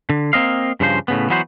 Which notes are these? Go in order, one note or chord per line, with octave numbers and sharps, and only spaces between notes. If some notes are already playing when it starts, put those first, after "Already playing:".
D3
A#3 C4 D#5 F5
G2 C#3 F3 C5
A2 C#3 B3
E3 F#3 B3 F#4 C5